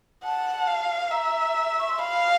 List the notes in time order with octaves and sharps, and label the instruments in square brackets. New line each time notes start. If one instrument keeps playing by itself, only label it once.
[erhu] F#5 [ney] A5
[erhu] F5
[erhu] E5 [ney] A#5
[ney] C#6
C6
[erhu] F5 [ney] B5